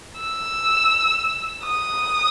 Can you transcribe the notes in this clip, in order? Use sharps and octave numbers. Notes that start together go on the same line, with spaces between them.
E6
D#6